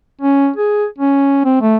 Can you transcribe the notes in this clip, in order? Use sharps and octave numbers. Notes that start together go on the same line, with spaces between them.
C#4
G#4
C#4
C4
A3